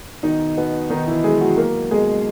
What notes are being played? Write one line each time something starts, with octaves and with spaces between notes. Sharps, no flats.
B2 D#3 D#4
B2 B3
B2 D#3 D#4
E3 E4
F#3 G#3 G#4
F#3 F#4
F#3 A#3 A#4
B2 G#3 G#4